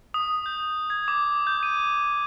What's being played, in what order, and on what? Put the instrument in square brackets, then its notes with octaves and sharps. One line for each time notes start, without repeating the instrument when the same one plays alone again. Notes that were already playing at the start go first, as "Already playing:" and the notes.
[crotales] D#6
G6
G#6
D6
G6
D#7